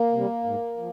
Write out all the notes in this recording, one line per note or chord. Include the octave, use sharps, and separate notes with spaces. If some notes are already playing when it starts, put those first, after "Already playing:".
Already playing: A#3
C3 G3
G#2
F3